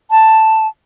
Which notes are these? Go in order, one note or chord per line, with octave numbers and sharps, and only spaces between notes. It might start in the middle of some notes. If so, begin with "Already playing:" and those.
A5